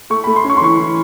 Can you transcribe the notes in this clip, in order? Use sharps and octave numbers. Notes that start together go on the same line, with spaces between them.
A3 C#6
B5
A3
C6
C#4
C#6
C6
E3 C#6
E3